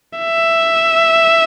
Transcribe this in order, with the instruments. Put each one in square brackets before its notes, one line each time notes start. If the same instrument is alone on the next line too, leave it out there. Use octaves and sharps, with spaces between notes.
[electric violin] E5